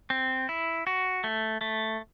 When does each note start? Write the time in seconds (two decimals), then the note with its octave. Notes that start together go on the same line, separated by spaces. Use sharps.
0.10 C4
0.49 E4
0.87 F#4
1.24 A3
1.61 A3